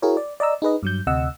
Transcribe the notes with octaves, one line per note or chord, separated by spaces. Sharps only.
E4 F#4 G#4 A#4 C#5
D5
D5 D#5 A#5 E6
D#4 G#4 B4 D#5
G2 F#3 G6
D2 C3 D#5 F#5 E6